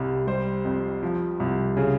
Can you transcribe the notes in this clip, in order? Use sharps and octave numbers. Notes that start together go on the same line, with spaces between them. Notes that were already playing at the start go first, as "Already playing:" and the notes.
Already playing: C2 G3
G3 C5
F2
F3
C2
C#3 G#4